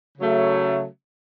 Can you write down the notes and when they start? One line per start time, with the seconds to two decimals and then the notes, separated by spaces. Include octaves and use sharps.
0.18 C#3 F#3 A3